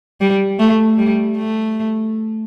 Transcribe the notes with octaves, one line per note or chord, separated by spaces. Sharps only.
G3
A3
G3
A3